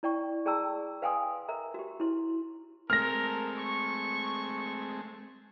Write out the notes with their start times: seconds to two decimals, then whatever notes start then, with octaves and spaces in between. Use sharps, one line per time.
0.03 E4 D5 G5 C#6
0.46 G#4 D5 G5 A5 A#5 E6
1.02 B4 F5 G5 G#5 C6 D#6
1.48 A#4 E5 A#5
1.74 F#4 G4
2.00 E4 C6
2.90 G#3 A3 C4 A4 A#4 F6 A#6
3.57 C#6